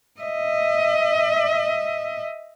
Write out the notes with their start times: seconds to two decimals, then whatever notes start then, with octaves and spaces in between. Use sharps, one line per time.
0.21 D#5 E5